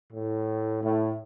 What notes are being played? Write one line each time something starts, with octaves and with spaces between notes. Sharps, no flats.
A2
A2